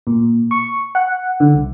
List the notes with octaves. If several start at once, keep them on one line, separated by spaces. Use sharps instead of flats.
A#2
C#6
F#5
D3
C2